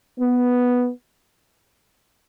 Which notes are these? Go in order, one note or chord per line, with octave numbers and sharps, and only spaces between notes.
B3